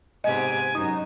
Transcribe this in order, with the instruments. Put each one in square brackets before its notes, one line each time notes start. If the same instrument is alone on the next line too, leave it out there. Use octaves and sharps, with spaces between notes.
[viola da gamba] G#2 C3 B3 [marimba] D#5 [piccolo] G#5
[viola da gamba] F#2 [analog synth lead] D#4